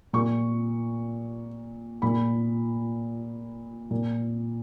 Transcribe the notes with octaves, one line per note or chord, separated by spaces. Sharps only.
A#2 C#6
A#2 B5
A#2